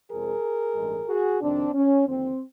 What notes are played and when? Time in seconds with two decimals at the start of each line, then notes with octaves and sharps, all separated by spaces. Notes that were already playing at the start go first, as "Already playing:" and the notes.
0.10 F2 C3 F3 G#3 C4 G#4 A#4
0.75 A1 G2 E3 G#3
1.08 F#4 G#4
1.41 F2 C3 D#3 C4 D4
1.74 C#4
2.07 D#2 D3 F3 C4